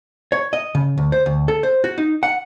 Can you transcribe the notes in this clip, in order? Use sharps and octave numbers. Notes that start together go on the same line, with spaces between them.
C#5
D#5
C#3
D2
C5
D2
A4
C5
F#4
D#4
F#5